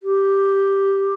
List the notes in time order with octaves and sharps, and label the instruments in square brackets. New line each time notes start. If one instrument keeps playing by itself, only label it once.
[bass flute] G4